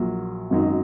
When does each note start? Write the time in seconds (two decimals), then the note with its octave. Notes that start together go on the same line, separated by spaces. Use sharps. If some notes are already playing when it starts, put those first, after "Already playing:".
Already playing: A#1 A#2 F#3
0.50 G#1 F#2 F#3 D#4